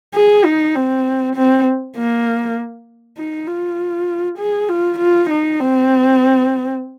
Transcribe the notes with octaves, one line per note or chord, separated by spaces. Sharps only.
G#4
D#4
C4
C4
A#3
D#4
F4
G#4
F4
F4
D#4
C4